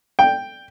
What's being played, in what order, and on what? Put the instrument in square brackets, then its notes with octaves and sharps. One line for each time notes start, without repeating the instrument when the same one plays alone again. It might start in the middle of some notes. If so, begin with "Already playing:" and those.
[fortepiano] G5